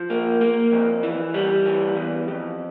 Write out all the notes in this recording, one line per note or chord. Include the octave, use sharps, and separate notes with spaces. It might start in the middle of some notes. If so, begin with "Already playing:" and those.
Already playing: F3
A#3
A#3
F2
E3
G3
E3
E2
F2